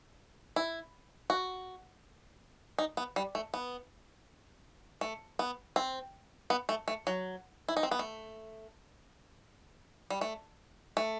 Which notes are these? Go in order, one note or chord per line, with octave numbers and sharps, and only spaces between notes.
E4
F#4
D#4
B3
G3
A3
B3
A3
B3
C4
B3
A3
A3
F#3
E4
D#4
C4
B3
A3
G3
A3
A3